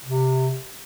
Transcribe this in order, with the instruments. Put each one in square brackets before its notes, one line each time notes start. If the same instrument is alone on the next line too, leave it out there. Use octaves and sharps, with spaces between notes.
[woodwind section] C3